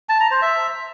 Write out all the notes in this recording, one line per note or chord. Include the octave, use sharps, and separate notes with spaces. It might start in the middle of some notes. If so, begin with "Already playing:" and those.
A5
A#5
C5
E5